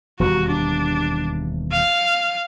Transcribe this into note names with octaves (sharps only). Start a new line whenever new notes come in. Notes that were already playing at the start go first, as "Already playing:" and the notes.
E1 D#2 G3 F#4
D4
F5